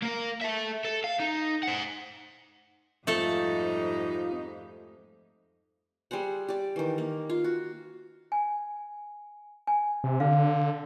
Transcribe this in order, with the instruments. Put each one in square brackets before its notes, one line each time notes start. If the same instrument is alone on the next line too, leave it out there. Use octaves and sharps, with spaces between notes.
[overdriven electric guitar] A#3 A#4
A4 E5
A4
F5
D#4
C5 F#5
[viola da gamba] F2 G#2 G3 [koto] A3 A4 [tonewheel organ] C4 F4 [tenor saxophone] D#4
[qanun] G3 G#4 C5 F#5
G4 D5
D#3 E3
A#3
F4
F#4
[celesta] G#5
G#5
[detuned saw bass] C3
[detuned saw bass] D3 [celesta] F5